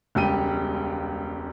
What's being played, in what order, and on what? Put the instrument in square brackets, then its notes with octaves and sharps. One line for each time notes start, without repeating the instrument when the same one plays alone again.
[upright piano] E1 C#2 G3 G4 G5 D#7